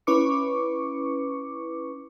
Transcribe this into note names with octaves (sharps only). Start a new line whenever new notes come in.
C#4 E4 B4 C#6 D6 C#7